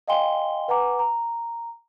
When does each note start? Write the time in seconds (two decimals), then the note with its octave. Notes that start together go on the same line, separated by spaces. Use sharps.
0.08 D#5 F5 G5 G#5 C6 G7
0.68 B4 F#5 G#5 A#5 D6
0.99 A#5